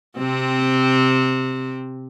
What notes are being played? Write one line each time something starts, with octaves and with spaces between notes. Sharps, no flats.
C3 C4